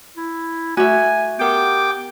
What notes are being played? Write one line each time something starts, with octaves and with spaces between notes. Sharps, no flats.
E4
A3 F#4 E5 G#5 G#6
B3 G4 A#4 F#5 G5 D6